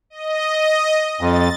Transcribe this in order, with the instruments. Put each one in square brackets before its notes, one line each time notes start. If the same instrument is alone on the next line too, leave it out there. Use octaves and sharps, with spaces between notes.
[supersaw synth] D#5
[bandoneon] F2 [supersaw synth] A6